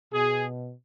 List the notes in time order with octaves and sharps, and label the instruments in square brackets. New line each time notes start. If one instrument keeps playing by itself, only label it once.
[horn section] B2 G#4